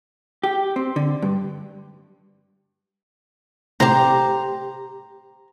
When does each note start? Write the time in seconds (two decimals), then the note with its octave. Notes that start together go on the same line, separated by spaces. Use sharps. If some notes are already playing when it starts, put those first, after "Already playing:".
0.44 G4
0.76 C4
0.96 D3
1.22 G2
3.80 A2 C3 G4 C5 A#5